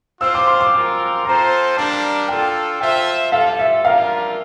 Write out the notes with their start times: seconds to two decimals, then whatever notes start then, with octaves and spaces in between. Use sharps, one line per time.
0.21 C4 F4 C5 F5 E6
0.34 D6
0.47 C6
0.60 D6
0.73 C4 F4 A#4
1.25 C4 F4 A4 C5 A#5
1.76 G3 A#3 D4 A5
2.28 D4 F4 A4 G5
2.81 F4 A4 C5 E5 G5
3.32 G3 C4 F4 A4 F5
3.59 E5
3.85 G3 A#3 D4 F4 A#4 F5